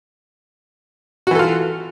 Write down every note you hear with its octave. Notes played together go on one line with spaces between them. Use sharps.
E3 F4 F#4 A4